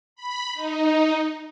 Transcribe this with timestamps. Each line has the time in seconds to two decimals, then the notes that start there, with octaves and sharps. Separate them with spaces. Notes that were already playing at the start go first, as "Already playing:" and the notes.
0.16 B5
0.54 D#4